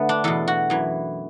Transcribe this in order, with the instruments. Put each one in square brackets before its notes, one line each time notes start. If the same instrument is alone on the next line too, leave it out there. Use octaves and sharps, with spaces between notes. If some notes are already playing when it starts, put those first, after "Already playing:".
Already playing: [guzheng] D3 A3 B3
D4
E2 B2 A4
F#4
F#2 E3